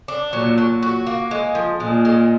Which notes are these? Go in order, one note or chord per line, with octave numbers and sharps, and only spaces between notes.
D4
A#2 F#3
F#3
F#4
A#3
G#3
F3
A#2 G#3
G#3